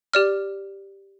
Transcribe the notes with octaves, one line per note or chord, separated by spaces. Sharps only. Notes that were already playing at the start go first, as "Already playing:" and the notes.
G4 D5 F6